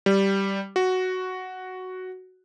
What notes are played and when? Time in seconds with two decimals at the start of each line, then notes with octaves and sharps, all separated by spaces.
0.06 G3
0.76 F#4